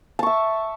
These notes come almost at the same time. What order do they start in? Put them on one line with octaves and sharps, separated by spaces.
A5 C#6 E5